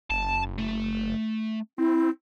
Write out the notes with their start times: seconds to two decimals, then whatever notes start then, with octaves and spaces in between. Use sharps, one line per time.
0.10 F#1 A5
0.59 A3
1.78 C4 E4